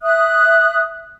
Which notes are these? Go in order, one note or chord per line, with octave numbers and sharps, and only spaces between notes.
E5 D#6 F#6